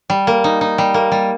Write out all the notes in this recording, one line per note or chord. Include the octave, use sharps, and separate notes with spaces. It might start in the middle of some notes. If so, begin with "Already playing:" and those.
G3
A#3
D#4
D#4
G3
A#3
G3